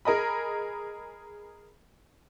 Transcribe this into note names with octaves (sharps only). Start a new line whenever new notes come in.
G#4 A#4 D#5 B5